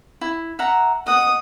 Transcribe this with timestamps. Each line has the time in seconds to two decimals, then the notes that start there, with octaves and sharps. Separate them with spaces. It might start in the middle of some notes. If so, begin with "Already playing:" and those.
0.21 E4
0.59 E5 F#5 A#5
1.06 D#5 F#5 D#6